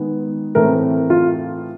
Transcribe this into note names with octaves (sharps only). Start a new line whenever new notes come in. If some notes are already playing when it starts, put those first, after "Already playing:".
Already playing: D#3 G#3 B3
A2 E3 A3 C4 A#4
F4